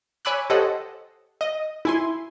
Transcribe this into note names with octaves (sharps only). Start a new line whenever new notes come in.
C#5 G#5 B5 D6 E6 F#6
G4 A4 C5 C#5 D#5 F#5
D#5
E4 G#5 C6